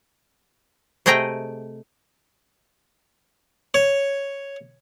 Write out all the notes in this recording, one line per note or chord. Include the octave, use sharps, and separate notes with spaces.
C3 A3 G#4 D#5 G5 A#5
C#5